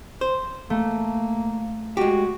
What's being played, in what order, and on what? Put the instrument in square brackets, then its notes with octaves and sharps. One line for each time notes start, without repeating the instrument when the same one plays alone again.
[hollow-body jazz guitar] C5
[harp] A3 [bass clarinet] A#3
[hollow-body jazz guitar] G#3 G4 [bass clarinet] F#4